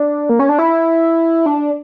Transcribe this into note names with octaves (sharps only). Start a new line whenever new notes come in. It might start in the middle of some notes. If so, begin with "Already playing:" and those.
Already playing: D4
A#3
C#4
D4
E4
D4